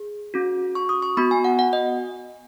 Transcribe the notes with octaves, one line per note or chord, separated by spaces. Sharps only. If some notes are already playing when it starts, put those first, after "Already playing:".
Already playing: G#4
C#4 F#4
C#6
D#6
C#6
B3 F#4 B5
G#5
F#5
F#5
D#5